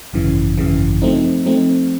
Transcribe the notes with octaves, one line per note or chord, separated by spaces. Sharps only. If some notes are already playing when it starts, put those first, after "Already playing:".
G#1 F#2 C#3 E3
G#1 F#2 C#3 E3
F3 A3 C4 D#4
F3 A3 C4 D#4